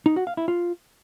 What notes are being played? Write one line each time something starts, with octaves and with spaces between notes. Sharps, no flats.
D#4
F#4
F5
E4
F4